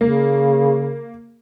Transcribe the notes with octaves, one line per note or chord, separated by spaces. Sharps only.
C#3 A#3